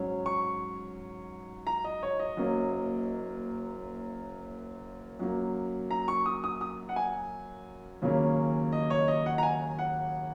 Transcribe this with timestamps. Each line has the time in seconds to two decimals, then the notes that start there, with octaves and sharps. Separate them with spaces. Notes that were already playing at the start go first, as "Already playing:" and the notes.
Already playing: G#2 F#3 C#4
0.26 C#6
1.67 A#5
1.84 D#5
2.03 C#5
2.19 D#5
2.37 F#1 F#2 F#3 A#3
5.19 F#2 F#3 A#3
5.91 A#5
6.08 C#6
6.26 D#6
6.44 D#6
6.61 D#6
6.89 F#5
6.96 G#5
8.02 D#2 C#3 F#3 A#3 C#4
8.72 D#5
8.90 C#5
9.08 D#5
9.26 F#5
9.38 A#5
9.43 G#5
9.79 F#5